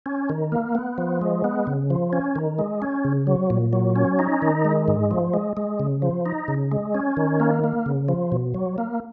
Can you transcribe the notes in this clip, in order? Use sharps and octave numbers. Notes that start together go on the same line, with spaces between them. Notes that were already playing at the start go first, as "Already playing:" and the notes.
C#4
D#3
A#3
B3
F3
G#3
B3
C#3
F3
C#4
D#3
G#3
C#4
C#3
F#3
A#2
F#3
C#4
D#4
D#3
G#3
G#2
F3
G#3
G#3
C#3
F3
D#4
C#3
G#3
C#4
D#3
A#3
A#3
C#3
F3
B2
F#3
A#3